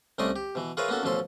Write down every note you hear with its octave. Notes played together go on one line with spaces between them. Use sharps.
C2 A3 C#4 D5 D#5 C6
G4
B2 E3
F4 G#4 A#4 B4 C#5 E5
A#3 B3 C#4 F#4 A4
A1 B2 F3 C#4 A4 C6